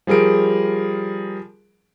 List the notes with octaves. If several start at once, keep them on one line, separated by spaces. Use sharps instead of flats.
F3 G3 G#4 A#4 D7